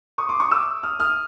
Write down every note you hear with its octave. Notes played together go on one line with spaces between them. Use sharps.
C#6 D#6
C6 D6
C#6 D#6
D6 E6
D#6 F6
D#6 F6